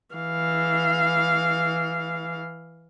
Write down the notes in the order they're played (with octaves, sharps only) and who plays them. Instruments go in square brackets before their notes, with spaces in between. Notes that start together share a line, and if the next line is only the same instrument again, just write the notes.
[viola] E3 F5